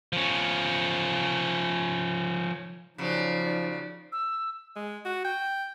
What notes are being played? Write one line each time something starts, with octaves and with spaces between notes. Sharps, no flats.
F3 C#4
C#3 F3 F#3 D#4 D5
E6
G#3
F#4
G5